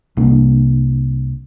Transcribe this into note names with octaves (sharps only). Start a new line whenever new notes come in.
C2 C3 A#3 D4